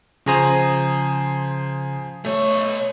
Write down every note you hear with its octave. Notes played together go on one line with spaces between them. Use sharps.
C#3 F3 G#4 C5 A#5 D#6
B2 A3 C#5